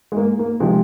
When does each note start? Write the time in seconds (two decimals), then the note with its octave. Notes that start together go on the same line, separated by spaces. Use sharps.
0.12 G#3
0.17 A#3
0.39 A#3
0.60 C3 F3 G#3